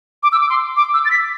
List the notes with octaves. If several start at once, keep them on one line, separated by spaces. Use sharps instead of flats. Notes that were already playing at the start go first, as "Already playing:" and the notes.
D6
E6
D6
C6
D6
E6
A6
B6